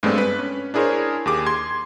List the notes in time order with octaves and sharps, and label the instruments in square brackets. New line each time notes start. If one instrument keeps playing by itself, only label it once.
[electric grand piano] G2 G#3 A3 B3 C4 D4
B4
C#4
D4 E4 G#4 A#4 C5 C#5
D#2 G4 G#4 D6
C6 G#6